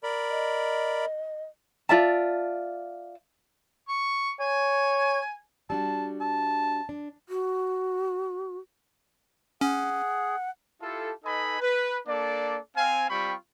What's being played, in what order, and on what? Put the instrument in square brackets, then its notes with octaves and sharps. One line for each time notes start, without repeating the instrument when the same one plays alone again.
[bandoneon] A#4 D5 B5
[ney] D#5
[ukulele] F4 D5 E5 A5
[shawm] C#6
[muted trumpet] C#5 [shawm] G#5
[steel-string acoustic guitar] G3 D4 F#4 [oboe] A5
[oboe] A5
[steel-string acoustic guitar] D4
[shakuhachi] F#4
[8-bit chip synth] C#4 [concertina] G#4 [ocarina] F#5
[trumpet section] E4 F4 G4 A4
D#4 A4 B4 D#5 G#5 B5
B4
A#3 D4 A4 D5
C4 F5 G#5
G3 C4 F4 G5 B5 C#6